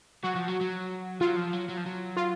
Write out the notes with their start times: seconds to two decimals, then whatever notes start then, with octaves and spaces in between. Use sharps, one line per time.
0.23 F#3 F#4
0.35 F3
0.48 F#3
0.61 F#3
1.21 F#3 F4
1.36 F3
1.53 F#3
1.69 F#3
1.77 F3
1.86 F#3
2.17 F4